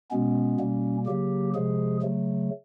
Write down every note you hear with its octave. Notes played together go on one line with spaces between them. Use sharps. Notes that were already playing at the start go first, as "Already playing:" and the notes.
B2 G#3 B3 C#4
B2 G3 A#3
C#3 F#3 A#3 G4
C3 F3 G#3 G#4
C#3 F#3 A3